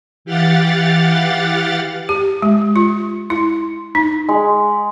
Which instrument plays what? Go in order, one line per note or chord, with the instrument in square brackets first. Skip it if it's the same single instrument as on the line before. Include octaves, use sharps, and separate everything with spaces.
[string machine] E3 G4 F5 F#5 A6
[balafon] G4
G#3
F4
E4
D#4
[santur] G#3